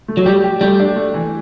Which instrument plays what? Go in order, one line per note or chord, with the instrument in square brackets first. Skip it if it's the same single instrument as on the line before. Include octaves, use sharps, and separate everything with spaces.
[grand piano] A3
[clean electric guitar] F#3
[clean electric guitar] G3 [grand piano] G4
[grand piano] G4
[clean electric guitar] G3 [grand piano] A3
[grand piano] D4
A3
E3